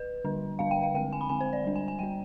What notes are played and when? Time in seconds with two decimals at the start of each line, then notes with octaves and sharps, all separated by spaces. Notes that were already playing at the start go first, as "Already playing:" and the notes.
Already playing: B4
0.24 D3 G3 D4
0.59 D3 G3 D4 F5
0.71 G5
0.83 F5
0.94 D3 G#3 C4 G5
1.13 G#5
1.21 B5
1.29 D3 G#3 C4 G#5
1.41 C5
1.53 D5
1.64 G3 D4
1.76 G#5
1.88 G#5
1.99 G3 D4 G5